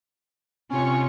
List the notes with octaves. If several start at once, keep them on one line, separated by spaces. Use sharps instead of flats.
C3 C#4 F4 C#6